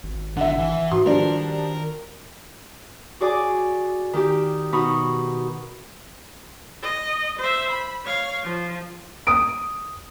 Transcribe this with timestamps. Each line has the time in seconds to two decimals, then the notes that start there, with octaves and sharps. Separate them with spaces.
0.03 G#1
0.37 D3 E4 E5 F#5
0.59 E3 G#5
0.92 G#2 F#4 C6
1.06 D#3 F3 G3 D4 A#4 B4 D5
3.20 F#4 G#4 D5 G#5 D6
4.13 D#3 G4
4.72 B2 D#4 B5 C#6 D#6
6.82 D#5
7.39 C5 E5
7.70 B5
8.05 C#5 F5
8.44 F3
9.27 D#6 D7